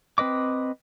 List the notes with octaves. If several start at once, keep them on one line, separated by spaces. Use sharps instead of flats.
C4 B4 D#5 D6